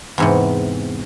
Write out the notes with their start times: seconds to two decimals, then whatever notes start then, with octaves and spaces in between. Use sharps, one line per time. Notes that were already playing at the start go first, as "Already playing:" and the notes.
0.18 E2 G#2 C3